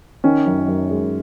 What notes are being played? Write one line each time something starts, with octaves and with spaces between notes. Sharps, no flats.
D#3 C#4
F#2
F#2
G#3